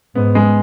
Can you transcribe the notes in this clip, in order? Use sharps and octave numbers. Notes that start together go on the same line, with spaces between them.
G#2 B3
G#3